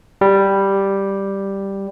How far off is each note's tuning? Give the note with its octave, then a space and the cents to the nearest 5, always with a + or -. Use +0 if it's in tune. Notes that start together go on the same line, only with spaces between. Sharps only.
G3 +0